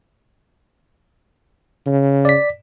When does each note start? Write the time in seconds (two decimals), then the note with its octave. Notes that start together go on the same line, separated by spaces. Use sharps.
1.86 C#3
2.25 D5 B6